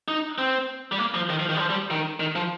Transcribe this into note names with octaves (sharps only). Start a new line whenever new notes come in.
D#4
C4
G3
A#3
F3
D#3
F3
D#3
G3
F3
G3
D#3
D#3
F3